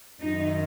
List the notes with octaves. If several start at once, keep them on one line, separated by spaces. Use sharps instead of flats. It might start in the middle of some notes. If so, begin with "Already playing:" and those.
F#2 D#3 D#4